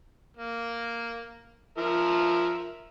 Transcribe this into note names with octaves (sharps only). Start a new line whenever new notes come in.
A#3
F3 A#4 E5